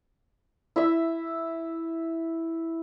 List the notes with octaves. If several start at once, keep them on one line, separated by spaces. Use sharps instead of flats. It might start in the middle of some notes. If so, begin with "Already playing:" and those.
E4 E5